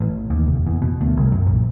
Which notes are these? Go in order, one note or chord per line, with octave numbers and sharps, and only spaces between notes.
A1
D#2
F1
E2
B2
D2
C2
F#2
A#1